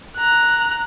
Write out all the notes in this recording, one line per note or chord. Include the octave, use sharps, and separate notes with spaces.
A#5 F#6